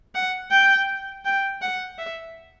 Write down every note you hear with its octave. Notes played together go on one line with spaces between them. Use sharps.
F#5
G5
G5
F#5
E5